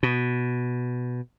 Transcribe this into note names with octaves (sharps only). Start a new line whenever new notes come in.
B2